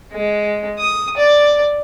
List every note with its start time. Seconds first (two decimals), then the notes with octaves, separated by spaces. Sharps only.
0.12 G#3
0.78 D#6
1.17 D5